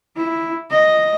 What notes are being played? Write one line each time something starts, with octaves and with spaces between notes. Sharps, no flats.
E4
D#5